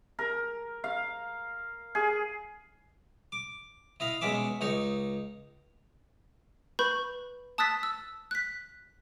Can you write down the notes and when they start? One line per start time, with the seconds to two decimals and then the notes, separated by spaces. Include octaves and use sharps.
0.19 A#4
0.84 F5
1.95 G#4
3.32 D6
4.00 E4 D#5 F5
4.21 B2 G#3 C#4 E5 D6
4.61 C#2 D#4 C#5
6.79 B4 B5 C#6 G6
7.58 A5 D#6 E6 F#6 A6 B6
7.83 E6
8.31 F#6 B6